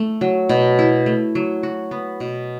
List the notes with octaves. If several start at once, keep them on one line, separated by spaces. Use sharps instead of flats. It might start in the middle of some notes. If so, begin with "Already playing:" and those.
Already playing: A3
F#3
B2
E4
A3
F#3
F#4
B3
B2